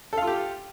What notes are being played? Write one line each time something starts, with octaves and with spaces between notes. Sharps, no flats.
F4 G4 A4 F5